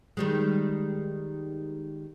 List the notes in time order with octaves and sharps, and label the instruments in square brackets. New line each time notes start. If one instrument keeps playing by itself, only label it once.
[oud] D#3 G3 G#3